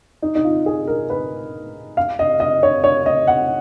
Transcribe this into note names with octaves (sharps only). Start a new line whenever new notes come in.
D#4
D#4
F4
G#4
A#4
B4
F5
D#5
D#5
C#5
C#5
D#5
F#5